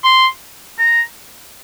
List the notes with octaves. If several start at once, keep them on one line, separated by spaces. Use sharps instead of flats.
C6
A#5